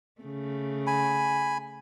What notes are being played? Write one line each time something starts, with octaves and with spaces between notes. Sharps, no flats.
C#3 A3
G#5 B5